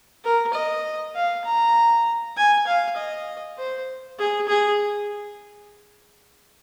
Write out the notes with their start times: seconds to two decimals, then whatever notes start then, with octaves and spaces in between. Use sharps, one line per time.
0.24 A#4
0.54 D#5
1.15 F5
1.45 A#5
2.37 G#5
2.67 F5
2.97 D#5
3.58 C5
4.19 G#4
4.48 G#4